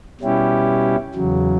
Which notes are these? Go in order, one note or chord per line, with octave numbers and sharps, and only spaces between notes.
B2 G3 C#4 E4 G4
E2 C#3 F#3